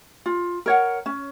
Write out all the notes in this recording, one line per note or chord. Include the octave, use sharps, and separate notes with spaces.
F4
A#4 C#5 F#5
C#4